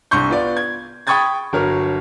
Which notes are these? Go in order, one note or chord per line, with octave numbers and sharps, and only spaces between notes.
C2 G2 C6 C#6 G6
B3 F4 D5
G#6
G5 B5 C#6 D#6 G#6 A6
G1 F#3 A#4 C#5 F6